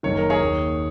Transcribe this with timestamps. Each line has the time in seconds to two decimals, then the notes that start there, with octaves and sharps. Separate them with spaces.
0.03 F#1 F#2 D#3 C#5
0.17 A#4
0.30 G#4 C#5
0.41 D#2 D#3